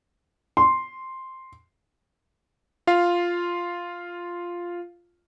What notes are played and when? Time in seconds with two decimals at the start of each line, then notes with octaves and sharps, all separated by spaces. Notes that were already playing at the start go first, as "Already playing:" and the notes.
0.57 C6
2.87 F4 F5